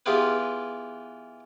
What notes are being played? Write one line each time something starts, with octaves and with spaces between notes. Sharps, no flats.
E3 B3 F4 G4 G#4 B4